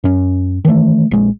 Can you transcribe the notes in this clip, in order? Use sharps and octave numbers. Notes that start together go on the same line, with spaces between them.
F#2 C#4
D#3 E3 G3 A3
A#1 G#3